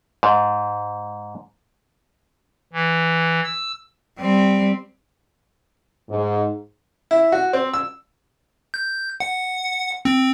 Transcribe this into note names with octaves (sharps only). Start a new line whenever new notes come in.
G#2
E3
E6
G3 C4
G#2
E4
F#4
C4
E6
G6
F#5
C4